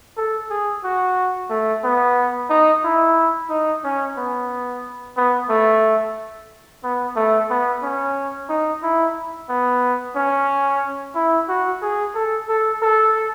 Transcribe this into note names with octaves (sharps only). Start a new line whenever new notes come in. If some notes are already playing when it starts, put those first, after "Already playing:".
A4
G#4
F#4
A3
B3
D#4
E4
D#4
C#4
B3
B3
A3
B3
A3
B3
C#4
D#4
E4
B3
C#4
E4
F#4
G#4
A4
A4
A4